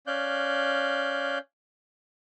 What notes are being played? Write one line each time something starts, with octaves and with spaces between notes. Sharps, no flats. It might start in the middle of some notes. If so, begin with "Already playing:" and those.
C#4 D5 F5 F#6 G6